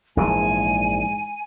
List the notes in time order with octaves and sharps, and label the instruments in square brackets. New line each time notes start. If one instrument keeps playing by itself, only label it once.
[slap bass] A#1 E3 G#3 [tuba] G#2 [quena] G#5